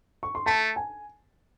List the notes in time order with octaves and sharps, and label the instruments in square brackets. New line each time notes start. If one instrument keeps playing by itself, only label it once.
[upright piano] C#6
C6
[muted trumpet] A3 [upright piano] A5
[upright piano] G#5